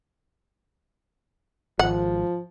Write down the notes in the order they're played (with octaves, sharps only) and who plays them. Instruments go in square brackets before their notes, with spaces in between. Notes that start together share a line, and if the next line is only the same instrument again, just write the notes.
[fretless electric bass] G#1 [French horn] F3 [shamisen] F#5